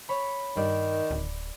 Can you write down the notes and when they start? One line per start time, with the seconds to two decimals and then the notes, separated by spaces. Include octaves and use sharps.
0.09 C#5 B5
0.57 G2 D#3 D5
1.10 D1